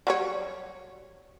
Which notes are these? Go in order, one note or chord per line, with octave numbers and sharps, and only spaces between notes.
F#3 G3 C#5